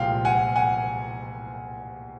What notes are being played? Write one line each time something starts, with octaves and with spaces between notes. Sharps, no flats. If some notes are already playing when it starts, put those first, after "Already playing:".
Already playing: C2 A#2 F3 G#3 F5 G5
F#5 G#5
F#5 G#5